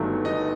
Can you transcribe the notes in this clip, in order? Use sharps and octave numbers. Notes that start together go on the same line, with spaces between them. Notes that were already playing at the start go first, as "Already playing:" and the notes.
Already playing: G1 G2 D#3 F#3 A3
D#4 D#5